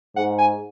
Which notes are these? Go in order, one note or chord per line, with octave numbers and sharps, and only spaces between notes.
G#2 F#5
G#5